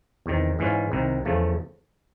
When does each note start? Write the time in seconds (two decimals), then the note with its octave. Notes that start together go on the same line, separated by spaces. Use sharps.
0.26 E2 C3 D#3
0.59 G#2 E3 G#3 C#4 F4
0.92 C2 C3 D#3
1.25 E2 C#3 F3 A3